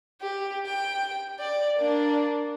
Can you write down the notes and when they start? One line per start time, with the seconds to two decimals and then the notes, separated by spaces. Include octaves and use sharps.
0.21 G4
0.66 G5
1.39 D5
1.77 A#3 D4